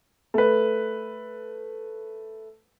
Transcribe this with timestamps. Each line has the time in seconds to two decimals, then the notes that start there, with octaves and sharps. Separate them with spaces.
0.34 A3 B4